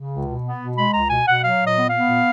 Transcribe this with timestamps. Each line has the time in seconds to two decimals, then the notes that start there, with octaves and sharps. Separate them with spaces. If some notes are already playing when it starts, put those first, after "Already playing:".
Already playing: C#3
0.10 C#2
0.27 B2
0.43 B3
0.60 B2
0.76 G#3 B5
0.93 C#2 A#5
1.09 B2 G#5
1.26 B2 F#5
1.43 F#3 F5
1.59 A#2
1.64 D#5
1.76 B3
1.87 F5
1.93 B3
2.09 A#2